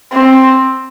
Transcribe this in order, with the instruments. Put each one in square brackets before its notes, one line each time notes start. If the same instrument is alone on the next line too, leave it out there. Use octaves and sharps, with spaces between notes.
[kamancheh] C4